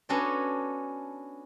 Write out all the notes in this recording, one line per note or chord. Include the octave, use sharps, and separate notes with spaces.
B3 C#4 D4 F#4 A4 C#5